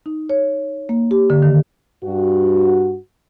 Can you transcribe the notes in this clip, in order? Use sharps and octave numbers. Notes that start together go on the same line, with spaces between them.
D#4
C#5
A#3
G4
D3
D#3
G2 F#4